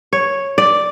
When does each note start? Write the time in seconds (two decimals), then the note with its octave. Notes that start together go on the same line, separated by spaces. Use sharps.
0.13 C#5
0.58 D5